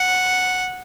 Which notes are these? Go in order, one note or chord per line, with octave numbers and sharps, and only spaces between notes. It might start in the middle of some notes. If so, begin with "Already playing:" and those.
Already playing: F#5